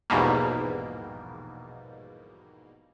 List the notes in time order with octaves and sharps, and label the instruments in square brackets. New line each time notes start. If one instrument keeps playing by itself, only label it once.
[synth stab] A#1 E2 G#2 B2 G3 A#3